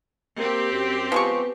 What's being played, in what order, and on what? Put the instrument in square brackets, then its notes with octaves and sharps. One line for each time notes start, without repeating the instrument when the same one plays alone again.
[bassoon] A#3 [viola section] C4 G4
[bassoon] F#2
[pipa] F3 G#3 C#6 [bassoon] B3